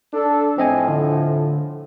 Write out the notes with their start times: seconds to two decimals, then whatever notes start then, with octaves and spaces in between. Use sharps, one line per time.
0.13 D4 A4
0.58 A2 F3 C4 D#5 G#5
0.89 D3